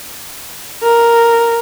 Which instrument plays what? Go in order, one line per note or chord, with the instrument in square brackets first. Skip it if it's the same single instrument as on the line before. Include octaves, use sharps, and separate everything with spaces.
[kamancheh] A#4